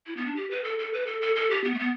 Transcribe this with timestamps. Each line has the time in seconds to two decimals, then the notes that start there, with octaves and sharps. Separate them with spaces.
0.07 E4
0.17 B3
0.26 D4
0.36 G4
0.51 B4
0.64 A4
0.79 A4
0.93 B4
1.07 A4
1.22 A4
1.36 A4
1.51 G4
1.64 B3
1.74 A3
1.79 B3